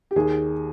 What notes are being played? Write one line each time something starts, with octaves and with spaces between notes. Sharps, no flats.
G4
D#2 G#4